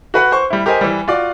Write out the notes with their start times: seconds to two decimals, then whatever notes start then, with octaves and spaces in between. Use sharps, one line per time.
0.14 F#4 B4 F#5
0.32 C5 C#6
0.50 G3 E4
0.66 G4 A#4 C5 D#5 G#5
0.81 E3 G3
1.08 F4 F#4 D5